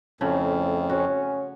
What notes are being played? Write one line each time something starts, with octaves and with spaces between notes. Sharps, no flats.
F2 A2 C#3 A3
C#4 F#4